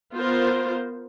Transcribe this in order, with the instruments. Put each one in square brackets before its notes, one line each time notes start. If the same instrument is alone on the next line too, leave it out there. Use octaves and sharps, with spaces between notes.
[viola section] B3 F4 A#4 C5